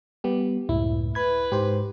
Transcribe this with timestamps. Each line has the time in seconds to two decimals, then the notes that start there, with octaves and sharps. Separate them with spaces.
0.24 G3 B3 G4
0.69 C#2 F#2 A2 E4
1.15 B4 B5 G#6
1.52 G#2 G4 C5